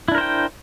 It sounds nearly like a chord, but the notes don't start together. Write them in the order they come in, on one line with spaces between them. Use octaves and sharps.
E4 D4 A#4 C5 G5